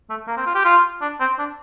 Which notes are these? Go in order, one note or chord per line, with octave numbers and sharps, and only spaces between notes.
A3
A#3
C4
F4
G4
F4
D4
C4
D4